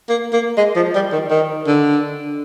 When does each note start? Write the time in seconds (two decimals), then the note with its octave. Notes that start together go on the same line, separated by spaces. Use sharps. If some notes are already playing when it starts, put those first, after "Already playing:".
0.09 A#3
0.33 A#3
0.57 G#3
0.76 F3
0.95 G3
1.13 D#3
1.31 D#3
1.67 D3